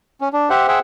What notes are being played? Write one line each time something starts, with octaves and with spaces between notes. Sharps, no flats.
C#4
D4
G4 C5 E5 F#5
G#4 C5 E5 F#5 G5